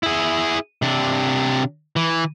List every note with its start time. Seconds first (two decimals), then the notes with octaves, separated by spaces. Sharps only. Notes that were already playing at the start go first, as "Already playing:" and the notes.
0.03 E4 G#4
0.82 C3 D4
1.96 E3